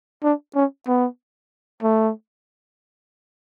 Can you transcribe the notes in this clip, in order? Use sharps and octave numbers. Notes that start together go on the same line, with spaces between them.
D4
C#4
B3
A3